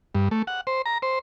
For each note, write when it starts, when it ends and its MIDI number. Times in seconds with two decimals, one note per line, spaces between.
0.15 0.29 43
0.31 0.42 57
0.47 0.61 78
0.67 0.82 72
0.86 0.98 82
1.02 1.19 72